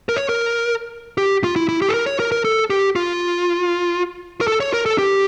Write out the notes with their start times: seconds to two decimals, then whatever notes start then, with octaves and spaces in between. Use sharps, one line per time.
0.09 A#4
0.16 C#5
0.29 A#4
1.18 G4
1.44 F4
1.56 E4
1.69 E4
1.82 G4
1.89 A4
1.94 A#4
2.06 C#5
2.20 A#4
2.32 A#4
2.45 A4
2.70 G4
2.96 F4
4.41 A#4
4.47 A4
4.60 C#5
4.74 A#4
4.86 A4
4.98 G4